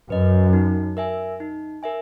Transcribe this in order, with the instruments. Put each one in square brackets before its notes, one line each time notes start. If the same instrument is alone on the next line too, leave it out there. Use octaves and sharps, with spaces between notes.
[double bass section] F#2 [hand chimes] B4 D#5
[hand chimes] D#4
A#4 E5 G#5
D#4
A#4 E5 G#5